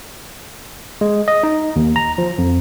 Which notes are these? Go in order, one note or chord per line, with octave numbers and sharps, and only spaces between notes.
G#3
D#5
D#4
D#2
A#5
F3
F2